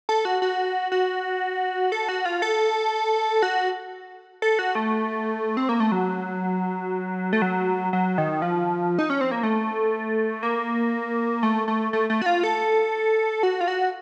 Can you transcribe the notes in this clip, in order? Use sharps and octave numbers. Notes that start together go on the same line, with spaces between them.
A4
F#4
F#4
F#4
A4
F#4
F4
A4
F#4
A4
F#4
A3
C4
A#3
A3
F#3
A3
F#3
F#3
D#3
F3
D#4
C#4
C4
A#3
A3
A#3
A3
A3
A3
A3
F#4
F4
A4
F#4
F4
F#4